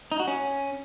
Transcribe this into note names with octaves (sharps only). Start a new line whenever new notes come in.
D#4
F#4
C#4